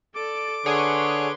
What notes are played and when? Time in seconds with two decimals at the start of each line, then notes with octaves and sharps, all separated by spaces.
0.15 A4 D5 D6
0.66 D3 G#4 B4 C#5 C6